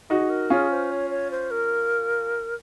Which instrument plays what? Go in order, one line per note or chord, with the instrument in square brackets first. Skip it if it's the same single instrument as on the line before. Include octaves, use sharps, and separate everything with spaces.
[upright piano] D#4 F#4 [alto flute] G#4
[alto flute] A#4
[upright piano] C#4 F4 [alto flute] G#4
[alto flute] C5
C#5
C#5
C5
A#4